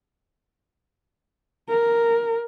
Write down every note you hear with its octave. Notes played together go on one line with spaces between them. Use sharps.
A#4